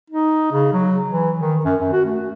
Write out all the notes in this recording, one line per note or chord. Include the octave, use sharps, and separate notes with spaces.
D#4
C#3
F#3
E3
D#3
F#2
F#2
F#4
A3